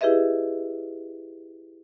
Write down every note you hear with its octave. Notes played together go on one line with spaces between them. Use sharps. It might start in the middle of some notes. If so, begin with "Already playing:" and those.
E4 G4 G#4 B4 D#5 E5